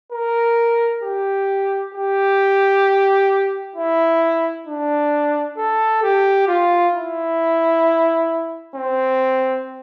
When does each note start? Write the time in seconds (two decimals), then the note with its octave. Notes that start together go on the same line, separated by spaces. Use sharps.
0.12 A#4
1.03 G4
1.94 G4
3.76 E4
4.67 D4
5.57 A4
6.03 G4
6.48 F4
6.94 E4
8.75 C4